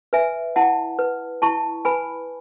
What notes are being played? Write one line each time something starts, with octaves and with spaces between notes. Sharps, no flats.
B4 E5 G#5
E4 F#5 A5
B4
E4 A5 C#6
B4 G#5 B5